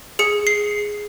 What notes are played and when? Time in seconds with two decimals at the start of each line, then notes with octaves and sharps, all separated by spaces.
0.19 G#4 C#7
0.47 C7